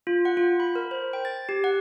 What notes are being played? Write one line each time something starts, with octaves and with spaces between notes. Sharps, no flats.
F4
F#5
F4
B5
A#4
C5
G5
A6
G4
F#5